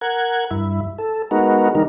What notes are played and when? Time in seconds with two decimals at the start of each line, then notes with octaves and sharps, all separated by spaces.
0.01 A#4 F#5 G#6
0.51 G2 E4
0.98 A4
1.31 G#3 B3 D#4 F#4 A#4
1.75 D#3 G3 D#4 A#4